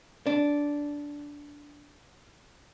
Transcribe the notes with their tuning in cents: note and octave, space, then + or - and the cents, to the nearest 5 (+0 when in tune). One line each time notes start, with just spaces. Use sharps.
D4 -10